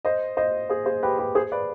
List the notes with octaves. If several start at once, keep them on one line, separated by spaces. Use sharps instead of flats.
C5 D#5
C5 D#5
G#4 C5
G#4 C5
G4 B4
G4 B4
G#4 C5
B4 D5